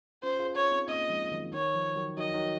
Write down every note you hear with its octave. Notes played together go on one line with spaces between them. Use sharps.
C#4 F4 C5
F4 G#4
C#5
C4 D#4
A#3 C#4 D#5
F3 G#3
D#3 F#3
D#3 C#5
F3
D#3 F#3
D#3 F#3 D#5
D#3 F#3